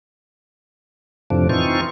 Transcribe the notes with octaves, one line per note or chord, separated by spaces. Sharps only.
F2 A2 C3 F3 D4
E3 C4 D#4 F4 C#6